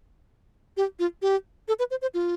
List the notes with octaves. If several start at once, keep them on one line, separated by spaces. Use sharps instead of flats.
G4
F4
G4
A4
B4
C5
C5
F4